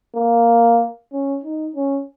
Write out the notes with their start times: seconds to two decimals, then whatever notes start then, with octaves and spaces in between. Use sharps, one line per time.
0.16 A#3
1.13 C#4
1.44 D#4
1.76 C#4